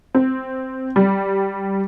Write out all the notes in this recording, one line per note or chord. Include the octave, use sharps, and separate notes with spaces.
C4
G3